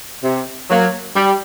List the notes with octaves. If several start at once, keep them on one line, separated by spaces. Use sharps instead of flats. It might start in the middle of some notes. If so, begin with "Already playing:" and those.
C3
F#3 A#3
G3